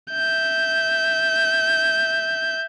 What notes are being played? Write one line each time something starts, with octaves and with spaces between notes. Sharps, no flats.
E5 G6